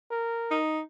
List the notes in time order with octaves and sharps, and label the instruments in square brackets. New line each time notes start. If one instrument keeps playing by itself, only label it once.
[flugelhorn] A#4
[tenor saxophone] D#4